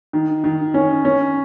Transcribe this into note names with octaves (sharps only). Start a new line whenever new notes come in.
D#3
D#3
C#4
C#4